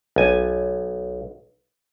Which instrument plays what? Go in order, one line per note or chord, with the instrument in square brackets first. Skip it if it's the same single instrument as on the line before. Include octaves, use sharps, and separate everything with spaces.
[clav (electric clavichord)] B1 G#5